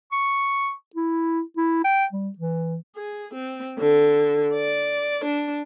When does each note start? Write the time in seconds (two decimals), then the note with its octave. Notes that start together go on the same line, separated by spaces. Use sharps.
0.12 C#6
0.96 E4
1.57 E4
1.84 G5
2.13 G3
2.39 E3
2.96 G#4
3.34 C4
3.79 D3
4.54 D5
5.24 D4